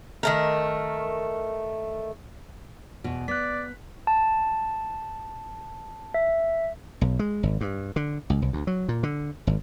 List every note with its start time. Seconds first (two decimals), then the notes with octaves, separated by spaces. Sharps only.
0.23 D#3 A3 A#4
3.04 E2 B2
3.28 B3 D5 F#6 B6
4.07 A5
6.14 E5
7.01 B1
7.19 G#3
7.43 G#1
7.61 G2
7.96 D3
8.30 C#2
8.42 C2
8.53 D2
8.67 F#3
8.88 A#2
9.03 D3
9.47 G#1